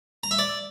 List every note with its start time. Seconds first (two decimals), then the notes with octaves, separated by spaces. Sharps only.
0.23 A#5
0.31 E5
0.39 D5